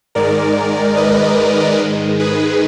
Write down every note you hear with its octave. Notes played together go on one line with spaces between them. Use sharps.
G#2 D#3 G#3 A#4 D5
B4 D#5
G#2 D#3 G#3
G#4 B4